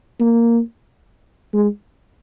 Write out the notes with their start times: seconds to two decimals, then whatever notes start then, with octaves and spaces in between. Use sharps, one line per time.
0.20 A#3
1.53 G#3